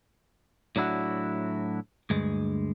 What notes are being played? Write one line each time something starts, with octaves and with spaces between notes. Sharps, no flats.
A2 F#3 D4 E4 F#4
D2 G2 G#3